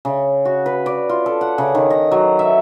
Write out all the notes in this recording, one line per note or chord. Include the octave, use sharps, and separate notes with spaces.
C#3
F#4
B4
D5
F4
A4
F#5
C#3
D#3
D#5
F#3
E5